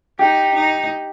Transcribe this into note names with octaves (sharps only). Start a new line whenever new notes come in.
D#4 G4
D#4